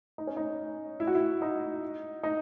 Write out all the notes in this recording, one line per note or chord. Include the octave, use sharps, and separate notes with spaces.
D#4
C#4
D#4
E4
F#4
E4
D#4
D#4